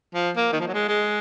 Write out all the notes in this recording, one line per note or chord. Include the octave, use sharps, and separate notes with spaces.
F3
A#3
D#3
F3
F#3
G#3
G#3